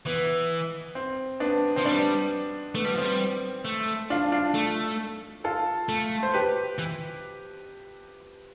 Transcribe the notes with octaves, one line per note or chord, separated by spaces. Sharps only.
E3 B3
C4
B3 D4
F3 C4
G3 B3 D4
A3 B3
G3
F3 B3 C4
G3
A3
D4 F4
D4 F4
A3
F4 A4
A3
C5
G4 B4
E3